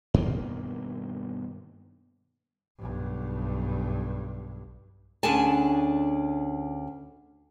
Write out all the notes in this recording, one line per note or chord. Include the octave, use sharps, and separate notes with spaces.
G2 B2 D#3 A#3
B1 G2
D2 C#4 D4 G#4 G#5 A5